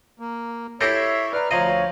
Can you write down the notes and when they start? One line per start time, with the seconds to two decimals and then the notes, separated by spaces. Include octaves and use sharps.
0.20 A#3
0.81 E4 G4 A4 C#5 E5 G6 A#6 C7
1.33 B4 D5 A#5 F6
1.51 D2 F3 C#5 D#5 F5 A#5